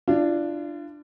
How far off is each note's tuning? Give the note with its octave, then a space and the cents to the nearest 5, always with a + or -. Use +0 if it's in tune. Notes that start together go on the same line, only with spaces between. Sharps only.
D4 +5 F4 -40